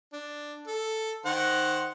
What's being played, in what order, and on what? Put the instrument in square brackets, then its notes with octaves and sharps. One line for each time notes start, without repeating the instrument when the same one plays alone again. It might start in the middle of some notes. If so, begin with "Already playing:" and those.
[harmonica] D4
A4
D#3 C5 F#5